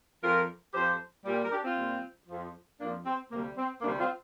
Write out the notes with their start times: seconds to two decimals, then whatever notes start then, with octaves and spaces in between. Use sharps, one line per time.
0.22 F2 F3 F4 A#4
0.74 F2 F3 G4 C5
1.25 A#2 G3
1.44 A#4
1.52 D4 G4
1.64 C4 F4
1.77 A#2 G3
2.28 F2 F3
2.80 F2 A#3 D4
2.83 F3
3.05 C4
3.31 D2 C3 G3 A#3
3.57 C4
3.82 D2 C3 G3 A#3 D4
3.99 C4 F4